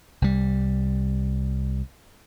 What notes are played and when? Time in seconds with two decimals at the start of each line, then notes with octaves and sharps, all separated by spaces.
0.22 C2 G3